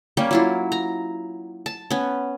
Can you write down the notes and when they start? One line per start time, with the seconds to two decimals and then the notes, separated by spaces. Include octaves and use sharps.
0.17 G3 A#3 C#4 G4
0.31 F#3 E4 F4
0.72 A#5
1.66 A5
1.91 B3 C#4